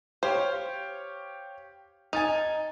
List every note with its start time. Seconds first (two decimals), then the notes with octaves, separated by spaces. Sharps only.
0.23 G4 C5 C#5 F5
2.13 D#4 G#5 A6 F7